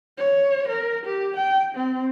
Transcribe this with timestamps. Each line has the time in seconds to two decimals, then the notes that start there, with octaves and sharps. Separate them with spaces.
0.18 C#5
0.68 A#4
1.06 G4
1.37 G5
1.75 C4